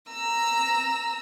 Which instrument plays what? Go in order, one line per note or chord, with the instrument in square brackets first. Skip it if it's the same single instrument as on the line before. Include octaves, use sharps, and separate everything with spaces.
[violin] A#5 E6